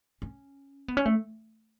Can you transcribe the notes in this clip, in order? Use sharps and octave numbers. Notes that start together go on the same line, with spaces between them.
C#4
B3
C#4
A3